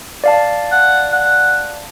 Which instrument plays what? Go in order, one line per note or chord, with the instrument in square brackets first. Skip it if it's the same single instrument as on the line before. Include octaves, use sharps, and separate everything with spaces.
[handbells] D5 F5 A5
[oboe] F#5
F#5